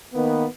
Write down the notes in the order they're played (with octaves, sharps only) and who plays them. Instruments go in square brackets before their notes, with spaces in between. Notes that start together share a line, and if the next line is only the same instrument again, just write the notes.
[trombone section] D#3 A#3 B3